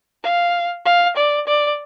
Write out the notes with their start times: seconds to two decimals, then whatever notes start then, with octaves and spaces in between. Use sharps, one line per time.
0.23 F5
0.85 F5
1.17 D5
1.47 D5